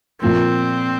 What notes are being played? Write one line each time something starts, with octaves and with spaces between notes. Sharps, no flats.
A#2 F3 A#3 C4